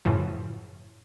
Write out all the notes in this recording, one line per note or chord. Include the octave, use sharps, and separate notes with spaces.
F#2 A2 C#3 E3 F3